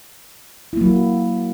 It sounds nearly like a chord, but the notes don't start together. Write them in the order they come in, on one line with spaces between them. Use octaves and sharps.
E4 A#3 F#3 F#4